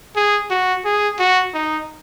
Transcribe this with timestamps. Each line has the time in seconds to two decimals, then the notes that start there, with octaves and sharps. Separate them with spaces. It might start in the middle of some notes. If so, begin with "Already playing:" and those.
0.16 G#4
0.50 F#4
0.85 G#4
1.19 F#4
1.54 D#4